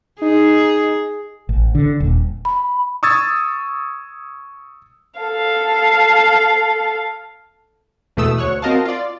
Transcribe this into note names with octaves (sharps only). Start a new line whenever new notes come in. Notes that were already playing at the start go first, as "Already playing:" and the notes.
D#4 G#4
A1
D3
D#1
B5
C#6 D#6 E6 G#6 A6
A4 F5
E2 B2 A3 D#6 E6
D2 C#5 C#6 F#6
C4 F#4 A#4 D#5 F5 A5
F4 D5